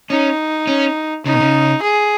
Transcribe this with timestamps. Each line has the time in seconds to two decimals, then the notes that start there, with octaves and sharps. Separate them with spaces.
0.10 C#4 D#4
0.67 C#4
1.25 C#3 D#4
1.33 B2
1.40 C#3
1.82 G#4